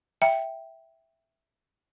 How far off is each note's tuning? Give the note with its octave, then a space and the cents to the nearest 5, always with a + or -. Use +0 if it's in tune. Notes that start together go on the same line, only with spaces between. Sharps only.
E5 +0 G5 +0